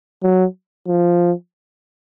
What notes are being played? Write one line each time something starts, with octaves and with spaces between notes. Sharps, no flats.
F#3
F3